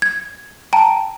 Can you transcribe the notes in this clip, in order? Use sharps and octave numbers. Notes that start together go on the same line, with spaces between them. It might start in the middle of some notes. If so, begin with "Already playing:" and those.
G#6
G5 A5 A#5 D7